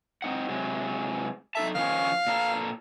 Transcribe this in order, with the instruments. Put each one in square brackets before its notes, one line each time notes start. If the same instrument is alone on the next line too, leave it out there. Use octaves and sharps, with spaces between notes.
[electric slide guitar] C4 D#4 F#5
C3 F#3 G#3
[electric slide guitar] D#4 A4 A5 [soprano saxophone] E5
[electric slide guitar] D#3 F3 C#4 [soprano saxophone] F5
[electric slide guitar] A#2 A4 A#5